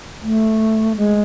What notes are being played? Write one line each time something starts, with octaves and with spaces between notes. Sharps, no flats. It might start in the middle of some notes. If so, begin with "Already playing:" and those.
A3
G#3